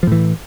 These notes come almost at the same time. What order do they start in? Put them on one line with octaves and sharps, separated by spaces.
F3 A2 E3